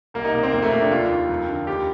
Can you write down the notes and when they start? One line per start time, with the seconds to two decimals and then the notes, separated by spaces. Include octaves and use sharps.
0.14 C2 A#3
0.24 D#4
0.34 C3 A#3
0.43 C4
0.53 F2 A#3
0.62 A3
0.72 C3 A#3
0.82 D4
0.91 D#2 F4
1.10 D#3
1.29 F2
1.49 D3
1.67 D#2 G4